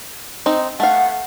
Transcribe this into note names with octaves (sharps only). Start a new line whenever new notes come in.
C4 D#4
A3 F5 F#5